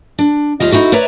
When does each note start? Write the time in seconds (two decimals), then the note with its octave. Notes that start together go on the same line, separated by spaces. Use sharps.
0.19 D4
0.60 D#2 G3 F4 D#5
0.71 D#4 E4 F#4 A4
0.92 B4 C#5 D5 E5 A#5